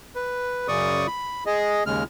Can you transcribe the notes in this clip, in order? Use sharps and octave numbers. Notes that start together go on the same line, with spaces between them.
B4
F#2 C#3 D5 C#6 D#6
B5
G#4 D#5
D#2 C#3 G#3 F6